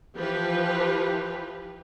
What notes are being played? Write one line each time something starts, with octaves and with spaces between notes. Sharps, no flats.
E3 F3 G4 B4